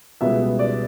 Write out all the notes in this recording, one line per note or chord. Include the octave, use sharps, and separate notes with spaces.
C#2 B2 G3 B3 E5
D5